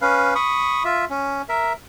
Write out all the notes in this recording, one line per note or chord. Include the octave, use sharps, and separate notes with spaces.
C#4 B4 F5
B5 C#6 D#6
F4 E5
C#4
A#4 E5